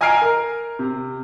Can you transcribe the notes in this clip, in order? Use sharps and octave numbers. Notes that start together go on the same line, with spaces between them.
D#5 G#5 A#5 F6 C7 D7
A#4
C3